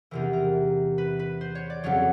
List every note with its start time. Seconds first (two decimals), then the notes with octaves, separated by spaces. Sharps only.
0.11 E2 C3 E3 A#4
0.33 A#4
0.98 B4
1.19 B4
1.41 C5
1.55 C#5
1.70 D5
1.84 F2 C#3 F#3 C#5